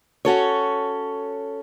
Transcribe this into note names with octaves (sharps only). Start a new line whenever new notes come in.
C#4 F#4 A4 C#5